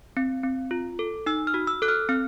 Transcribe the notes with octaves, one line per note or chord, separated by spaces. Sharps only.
C4
C4
F4
A4
D#4 E6
F6
F#4
E6
A4 F#6
F6
C4 F6